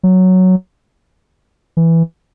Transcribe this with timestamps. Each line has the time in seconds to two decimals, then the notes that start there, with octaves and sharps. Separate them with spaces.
0.03 F#3
1.77 E3